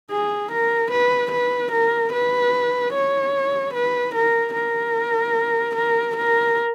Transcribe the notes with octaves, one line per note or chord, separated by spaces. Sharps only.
G#4
A#4
B4
B4
A#4
B4
C#5
B4
A#4
A#4
A#4
A#4